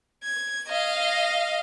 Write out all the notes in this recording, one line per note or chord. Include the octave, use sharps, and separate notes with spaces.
G#6
D#5 F5